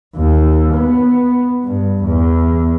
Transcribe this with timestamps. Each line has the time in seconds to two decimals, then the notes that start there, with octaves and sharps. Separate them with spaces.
0.16 D#2
0.73 B3
1.64 G2
2.04 E2